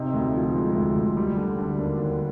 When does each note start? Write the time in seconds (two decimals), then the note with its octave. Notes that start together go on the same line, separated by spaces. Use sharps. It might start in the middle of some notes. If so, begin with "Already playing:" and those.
Already playing: C3 D#4
0.14 D2
0.34 F3
0.55 G#3
0.75 D2
0.96 D2
1.17 G3
1.37 D3
1.58 D3
1.78 D#2 D4
1.99 D#2